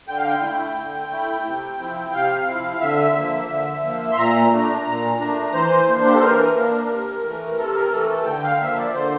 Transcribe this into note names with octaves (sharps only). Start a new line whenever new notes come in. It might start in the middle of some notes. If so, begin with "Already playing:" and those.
D3 G5
F5
G5
A3 E4
D3
A3 E4
C3
F3 C4 E4
C3 F5
F3 C4 E4
D3 E5
F3 A#3
D3
F3 A#3
C6
A#2 A#5
A3 D4
A#2
A3 D4
E3 C5
A#3 D4
G4
A4
E3 A#4
A#3 D4
C3
E3 A3
C3 A4
A#4
E3 A3 A4
A4
A5
D3 G5
F5
F3 A#3 E5
D5
D3 C5